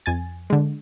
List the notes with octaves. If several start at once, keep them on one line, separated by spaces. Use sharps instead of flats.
F2 G#5 A6
D3 G#3